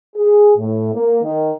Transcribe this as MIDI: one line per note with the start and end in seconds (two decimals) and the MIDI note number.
0.16 0.53 68
0.57 0.91 45
0.94 1.19 58
1.23 1.53 51